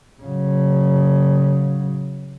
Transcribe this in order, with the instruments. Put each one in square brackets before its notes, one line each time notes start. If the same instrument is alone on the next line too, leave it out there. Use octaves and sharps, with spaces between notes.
[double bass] C#3 F#3